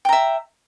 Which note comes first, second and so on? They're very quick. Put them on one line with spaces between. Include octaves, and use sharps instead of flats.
G5 A#5 E5